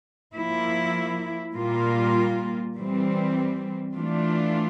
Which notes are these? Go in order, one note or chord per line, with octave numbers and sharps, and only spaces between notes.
F3 A#3 E4
A#2 G3 A#3 F4
E3 G3 C4
E3 A3 D4 F4